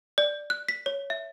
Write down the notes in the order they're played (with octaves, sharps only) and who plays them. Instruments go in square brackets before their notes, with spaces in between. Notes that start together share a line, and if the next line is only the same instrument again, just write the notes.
[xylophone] D5
F#6
B6
C#5
E5